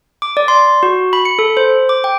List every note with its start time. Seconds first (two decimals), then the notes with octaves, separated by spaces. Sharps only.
0.22 D6
0.37 D5
0.48 C6
0.83 F#4
1.13 B5
1.25 C#7
1.39 A4
1.57 C5
1.89 D6
2.04 G5